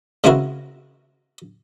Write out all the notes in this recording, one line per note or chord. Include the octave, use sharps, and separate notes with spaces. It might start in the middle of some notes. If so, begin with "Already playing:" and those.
C#3 G#3 C4 E4 F#4 A#4